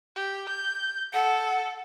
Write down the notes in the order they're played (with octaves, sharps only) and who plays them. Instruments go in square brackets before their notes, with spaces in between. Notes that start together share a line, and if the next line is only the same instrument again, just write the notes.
[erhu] G4
G6
[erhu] A4 [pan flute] F#5